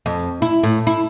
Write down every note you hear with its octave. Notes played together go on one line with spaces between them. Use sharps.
F2
E4
A2
E4